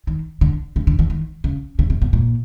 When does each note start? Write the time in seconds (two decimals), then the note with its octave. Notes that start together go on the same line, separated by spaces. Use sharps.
0.07 D#3
0.41 D3
0.76 C#3
0.87 D3
0.99 D#3
1.10 D#3
1.44 C#3
1.79 C#3
1.90 C3
2.02 B2
2.13 A#2